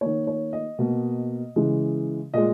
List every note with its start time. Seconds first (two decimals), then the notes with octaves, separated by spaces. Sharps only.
0.01 D#3 A#3 C#5
0.27 C#5
0.53 D#5
0.79 B2 A#3
1.56 C#3 E3 G#3
2.34 A#2 G#3 D#5